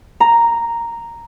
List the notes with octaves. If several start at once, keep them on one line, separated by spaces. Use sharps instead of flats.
A#5